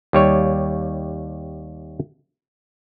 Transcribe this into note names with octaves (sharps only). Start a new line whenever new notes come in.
D#2 G3 C#5